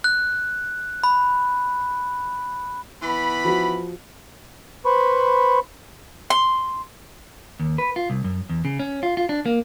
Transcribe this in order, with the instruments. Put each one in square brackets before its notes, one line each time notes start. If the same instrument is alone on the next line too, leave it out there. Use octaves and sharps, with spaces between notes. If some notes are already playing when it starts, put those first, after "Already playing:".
[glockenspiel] F#6
B5
[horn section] E3 B3 B5
[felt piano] F3 F#4
[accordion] B4 C5 B5 C#6
[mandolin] C6
[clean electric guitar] D#2
B4
F4
C2
F#2
E2
C#3
C#4
F4
F4
D4
A#3